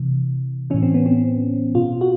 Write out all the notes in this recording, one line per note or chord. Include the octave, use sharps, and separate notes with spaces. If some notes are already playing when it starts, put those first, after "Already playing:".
Already playing: C3 E3
A2 E3 C#4
C4
B3
C4
B2 F4
F#4